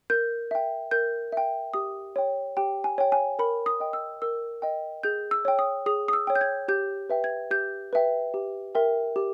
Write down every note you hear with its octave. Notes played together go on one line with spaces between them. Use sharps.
A#4 G6
E5 G5
A#4 G6
E5 G5
G4 D#6
C#5 G5
G4 G5
G#5
C#5 G5
G#5
A#4 B5
D#6
D#5 G5
E6
A#4 E6
D#5 G5
G#4 G6
E6
C#5 G5
D#6
G#4 D#6
D#6
E6
C#5 G5
G6
G#6
G4 G6
B4 E5 G5
G#6
G4 G6
B4 E5 G5
G4
A#4 E5 G5
G4